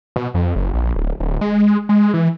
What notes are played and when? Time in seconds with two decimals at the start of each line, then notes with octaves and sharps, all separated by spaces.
0.16 B2
0.34 F2
0.56 F#1
0.74 A#1
0.96 D1
1.20 D1
1.41 G#3
1.89 G#3
2.14 E3